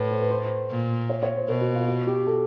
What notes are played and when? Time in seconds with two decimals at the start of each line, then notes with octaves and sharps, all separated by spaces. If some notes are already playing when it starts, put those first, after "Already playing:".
Already playing: A2 B4 C#5
0.11 C5
0.21 B4
0.30 C5
0.70 A#2
1.09 C#5
1.23 C#5
1.36 C5
1.48 B2 A#4
1.61 F#4
1.75 F4
1.88 F#4
2.07 G4
2.27 A4